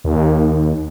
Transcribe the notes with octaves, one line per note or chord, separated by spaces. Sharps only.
D#2